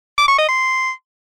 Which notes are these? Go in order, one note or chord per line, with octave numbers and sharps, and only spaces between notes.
D6
C#6
D#5
C6